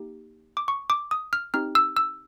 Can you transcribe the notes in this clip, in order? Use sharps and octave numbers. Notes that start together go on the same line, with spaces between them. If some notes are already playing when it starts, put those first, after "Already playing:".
Already playing: A#3 D#4 G4
D6
C#6
D6
D#6
F6
C4 D#4 G4 F6
E6
E6